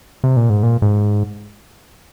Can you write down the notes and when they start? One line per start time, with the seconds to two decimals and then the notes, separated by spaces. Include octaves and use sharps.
0.24 C3
0.37 A#2
0.50 G#2
0.63 A#2
0.82 G#2